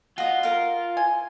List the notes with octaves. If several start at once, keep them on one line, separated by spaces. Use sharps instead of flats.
F4 F#4 D#5
A#4 F5
G#5